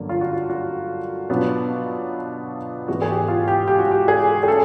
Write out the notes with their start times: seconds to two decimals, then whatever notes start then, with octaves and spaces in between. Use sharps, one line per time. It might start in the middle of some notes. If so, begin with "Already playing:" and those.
Already playing: G2 D3 F#3 A#3
0.09 F4
0.21 F#4
0.32 F4
0.50 F#4
1.30 B2 F#3 B3 D4 F4
2.88 G#2 E3 G#3 B3 F#4
3.02 G#4
3.09 G4
3.28 F4
3.48 G4
3.68 G4
3.79 F#4
3.91 G4
4.08 G#4
4.43 G#4
4.48 C#4 E4 A4